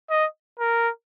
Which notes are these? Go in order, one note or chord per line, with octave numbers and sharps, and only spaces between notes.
D#5
A#4